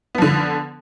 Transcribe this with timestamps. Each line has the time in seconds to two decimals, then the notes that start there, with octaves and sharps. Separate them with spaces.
0.15 B3
0.18 F3
0.22 D3